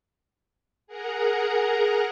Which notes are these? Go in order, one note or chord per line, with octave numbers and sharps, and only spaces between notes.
G#4 A#4 F#5 A#5